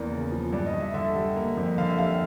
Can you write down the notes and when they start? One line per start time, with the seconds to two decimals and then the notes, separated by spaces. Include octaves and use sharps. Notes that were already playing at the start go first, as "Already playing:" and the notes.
Already playing: E2 A#3 D5
0.11 C#3
0.32 F3
0.53 G2 D5
0.66 D#5
0.74 G2
0.80 E5
0.94 D3 E5
1.16 G3
1.36 A#3
1.57 F2
1.78 D3 F5
1.88 E5
1.99 G3 F5